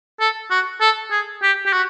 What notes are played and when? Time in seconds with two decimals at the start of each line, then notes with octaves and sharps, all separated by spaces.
0.20 A4
0.50 F#4
0.81 A4
1.11 G#4
1.42 G4
1.66 G4
1.73 F#4